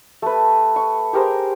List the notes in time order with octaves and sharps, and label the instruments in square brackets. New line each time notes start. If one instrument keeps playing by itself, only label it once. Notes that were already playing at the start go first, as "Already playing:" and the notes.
[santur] A3 B4
C#6
G4 G#4 A#4 C5